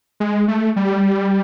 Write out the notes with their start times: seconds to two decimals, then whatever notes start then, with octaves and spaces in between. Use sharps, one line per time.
0.20 G#3
0.48 A3
0.76 G3